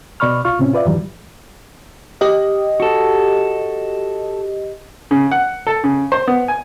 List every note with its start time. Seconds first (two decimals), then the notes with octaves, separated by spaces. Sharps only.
0.20 B2 D5 B5 C#6 F6
0.45 C2 F4 C#6 F6
0.59 A2 C3 C4 C#4
0.74 F4 B4 D5 E5
0.85 F2 G#2 D#3 E3 F#3 G3
2.21 G4 D#5
2.80 F#4 A4
5.11 C#3
5.31 F#5
5.67 A4
5.84 C#3
6.12 C5
6.27 B3
6.48 G#5